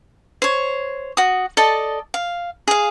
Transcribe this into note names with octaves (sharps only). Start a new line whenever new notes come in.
C5 C#5
F#4 D#6
A4 D5 D#5 A5
F5
G#4 F5